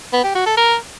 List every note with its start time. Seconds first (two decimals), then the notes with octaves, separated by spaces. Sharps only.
0.13 B3
0.24 G4
0.35 F#4
0.46 A4
0.57 A#4